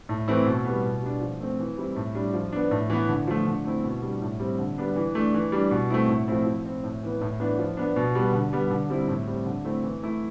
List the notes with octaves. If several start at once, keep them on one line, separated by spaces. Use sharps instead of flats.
A2
E3 A3 C4 E4
B2
G3 B3
B2
G3 D4
F3
A3 C4
E3
G3 C4 E4
A2
G3 D4
F3
B3 D4
A2
E3 B3
D3
F3 A3
D3
A3 C4 E4
B2
G3 D4
A2
G3 C4
D3
G3 B3 D4
E3
A3 D4
E3
G3 D4
B2
A3 C4 E4
A2
F3 A3 C4 E4
F3
C4 E4
A2
E3 B3
A2
E3 B3 D4
F3
B3 D4
B2
G3 B3
D3
G3 B3
D3
G3 C4 E4
A2
G3 C4
D3
A3 C4 E4
E3
A3 E4